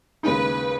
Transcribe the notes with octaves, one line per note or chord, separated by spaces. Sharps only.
D#2 C#3 G#3 D#4 B4